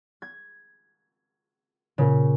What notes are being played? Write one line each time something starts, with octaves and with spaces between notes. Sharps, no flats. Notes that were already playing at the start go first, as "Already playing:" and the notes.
G#6
A#2 C#3